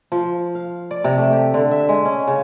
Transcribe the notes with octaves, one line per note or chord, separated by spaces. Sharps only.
F3
F5
D5
C3
A3
G4
D3
E5
G#3
C#4
C#3